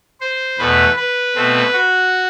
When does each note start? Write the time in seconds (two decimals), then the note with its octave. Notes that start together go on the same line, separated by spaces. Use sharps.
0.21 C5
0.58 E2 B2 A3 B4
0.96 B4
1.35 B2 A3 C4
1.73 F#4